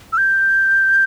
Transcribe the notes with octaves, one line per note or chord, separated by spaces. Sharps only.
E6
G6